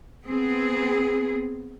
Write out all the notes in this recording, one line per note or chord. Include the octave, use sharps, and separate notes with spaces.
B3 C4 G#4